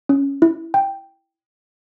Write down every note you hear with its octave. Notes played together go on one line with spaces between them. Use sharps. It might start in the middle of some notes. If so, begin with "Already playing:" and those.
C#4
E4
G5